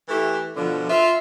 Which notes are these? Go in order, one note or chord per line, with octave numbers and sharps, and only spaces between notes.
E3 A3 E4 G4
B2 D3 F3
F4 E5